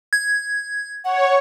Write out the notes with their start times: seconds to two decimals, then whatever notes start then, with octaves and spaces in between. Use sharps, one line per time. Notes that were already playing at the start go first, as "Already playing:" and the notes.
0.13 G#6
1.05 C#5 F#5